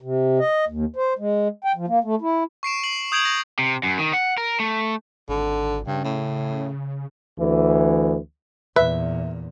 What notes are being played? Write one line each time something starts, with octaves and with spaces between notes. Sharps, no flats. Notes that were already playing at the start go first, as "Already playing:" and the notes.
C3
D#5
D#2
C5
G#3
G5
F3
A#3
A3
E4
C#6 C7 D7 E7
C7 F#7
D#6 G6 G#6 D7 F7 F#7
A#6
C3
F#2
D#3
F#5
A#4
A3
G#1 D3
G2 C#3
A2
D2 E3
E2 A#2 B4 E5